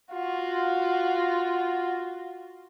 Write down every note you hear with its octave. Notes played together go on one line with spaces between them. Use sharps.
F4 F#4